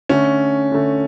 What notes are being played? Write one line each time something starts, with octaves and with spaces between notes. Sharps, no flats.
D3 A3 C#4
D3 A3